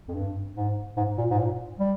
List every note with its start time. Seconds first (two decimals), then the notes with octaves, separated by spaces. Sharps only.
0.08 F2
0.14 G2
0.56 G#2
0.96 G#2
1.18 A#2
1.31 G#2
1.39 A#2
1.79 G3